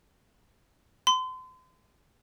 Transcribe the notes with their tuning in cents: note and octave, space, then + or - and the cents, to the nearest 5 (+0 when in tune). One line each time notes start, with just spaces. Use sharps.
C6 -35